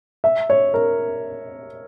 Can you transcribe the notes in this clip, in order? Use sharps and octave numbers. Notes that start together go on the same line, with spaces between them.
E5
C#5
A#4